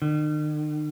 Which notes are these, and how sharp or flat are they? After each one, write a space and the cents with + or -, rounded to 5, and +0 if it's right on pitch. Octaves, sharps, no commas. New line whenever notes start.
D#3 -45